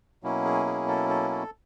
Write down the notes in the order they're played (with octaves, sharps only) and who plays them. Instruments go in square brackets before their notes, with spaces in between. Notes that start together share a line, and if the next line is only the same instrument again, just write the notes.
[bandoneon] B2 F#3 A#3 C#4 E4
G#4
G#4
A4
A4
A4